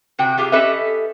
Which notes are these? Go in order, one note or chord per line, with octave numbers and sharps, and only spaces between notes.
C3 F#4 G5
C3 F4 G4 G#4
C#4 G4 A4 B4 D#5 E5